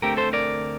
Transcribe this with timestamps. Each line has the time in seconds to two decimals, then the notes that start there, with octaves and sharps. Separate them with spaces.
0.02 D2 D3 A3 C4 G4 A#4
0.17 A4 C5
0.33 A#4 D5